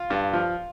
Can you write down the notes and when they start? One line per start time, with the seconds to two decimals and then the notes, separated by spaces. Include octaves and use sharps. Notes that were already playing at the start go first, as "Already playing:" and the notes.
Already playing: F4
0.10 G2
0.33 F3